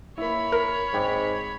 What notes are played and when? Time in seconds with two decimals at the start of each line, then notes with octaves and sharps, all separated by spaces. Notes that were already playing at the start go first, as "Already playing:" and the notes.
0.18 A#3 E4 C#5 B5
0.52 A#4
0.93 G#1 G#2 G5 D6